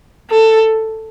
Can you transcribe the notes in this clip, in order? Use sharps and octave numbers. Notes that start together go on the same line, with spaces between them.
A4